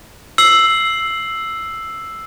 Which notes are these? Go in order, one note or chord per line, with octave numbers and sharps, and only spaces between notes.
E6 C7 F#7